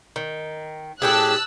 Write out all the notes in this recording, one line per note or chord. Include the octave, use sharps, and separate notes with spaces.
D#3
A2 G4 G#4 A5 E6 F#6